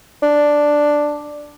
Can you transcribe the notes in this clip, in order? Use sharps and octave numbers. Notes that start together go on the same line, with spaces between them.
D4